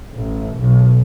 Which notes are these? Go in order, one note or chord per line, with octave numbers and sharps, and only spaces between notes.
A1
B1